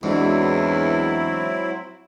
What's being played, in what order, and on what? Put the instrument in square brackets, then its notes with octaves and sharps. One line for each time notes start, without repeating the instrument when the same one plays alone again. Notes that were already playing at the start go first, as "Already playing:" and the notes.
[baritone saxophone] E2 [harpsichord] G#2 [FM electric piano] E3 D4 F#4 [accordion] F#3 C4 E4